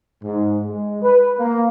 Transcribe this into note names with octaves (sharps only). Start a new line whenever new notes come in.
G#2
G#3
B4
A#3